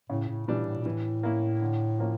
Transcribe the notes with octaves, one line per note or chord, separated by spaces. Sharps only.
A2 C#3
A2
A#2 E3 G3 D4
A2
A#2
A2 E3
A#3 C#4 E4
D3
F3 A#3 C#4